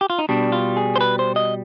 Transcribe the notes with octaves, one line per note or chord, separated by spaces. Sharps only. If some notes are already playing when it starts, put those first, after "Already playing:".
G4
F4
D#4
B2 G3 D4
F4
G#4
C5
B4
C5
D#5